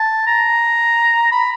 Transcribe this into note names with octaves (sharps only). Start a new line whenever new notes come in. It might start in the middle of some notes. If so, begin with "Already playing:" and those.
Already playing: A5
A#5
B5